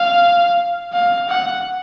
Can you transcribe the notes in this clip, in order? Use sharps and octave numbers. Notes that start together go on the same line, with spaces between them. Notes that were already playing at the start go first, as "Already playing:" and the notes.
Already playing: F5
F5
F#5